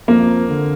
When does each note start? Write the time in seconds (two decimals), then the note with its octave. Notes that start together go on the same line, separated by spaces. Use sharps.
0.08 F2 A#3
0.49 D3